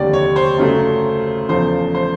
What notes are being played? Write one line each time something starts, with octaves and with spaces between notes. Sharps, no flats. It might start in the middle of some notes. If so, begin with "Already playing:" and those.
Already playing: F1 D#2 D3 G3 D5
C#5
C5
F#2 C#3 F#3 A3
E2 C#3 F3 A3 C5
C5